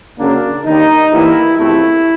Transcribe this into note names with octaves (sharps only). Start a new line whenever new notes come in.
F#2 C#3 F#3 A#3 D4
D#2 D#3 G3 D#4
A2 E3 G3 A#3 E4
E2 C3 F3 A3 E4